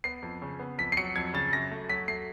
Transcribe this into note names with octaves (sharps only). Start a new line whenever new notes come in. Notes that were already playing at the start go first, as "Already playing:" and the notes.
B3 C7
F2
C#3
B3
F2 B6
C7
F#3 C#7
F2 G#6
C#3 A6
F#2 A#6
A3
F#3 B6
A3 C7